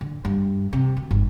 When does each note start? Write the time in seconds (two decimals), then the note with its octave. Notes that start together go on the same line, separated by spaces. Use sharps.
0.01 D3
0.25 G2
0.73 C3
0.97 D2
1.11 G1